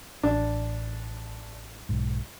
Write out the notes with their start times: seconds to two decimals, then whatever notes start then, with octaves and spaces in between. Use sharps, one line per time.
0.23 A1 D4
1.89 B1 G#2